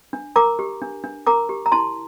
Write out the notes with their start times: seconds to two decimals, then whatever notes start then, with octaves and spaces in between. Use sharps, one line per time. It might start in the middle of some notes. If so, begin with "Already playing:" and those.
0.13 D4
0.36 A#4 A#5 D6
0.59 G4
0.81 D4
1.04 D4
1.27 A#4 A#5 D6
1.49 G4
1.66 A#5
1.72 E4 A5 C6